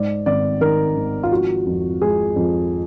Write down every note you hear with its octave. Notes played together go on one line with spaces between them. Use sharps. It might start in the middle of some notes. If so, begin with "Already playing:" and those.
Already playing: G#2 D5
G#1 D5
D#3 A#4
G#1
F4
F3 F#4
F2
G#3 G#4
F2